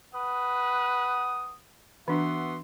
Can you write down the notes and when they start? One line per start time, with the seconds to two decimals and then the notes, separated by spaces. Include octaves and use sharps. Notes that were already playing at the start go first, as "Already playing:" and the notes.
0.15 B4 F#5 D#6
2.08 E3 B3 D4 F#4 E5 C6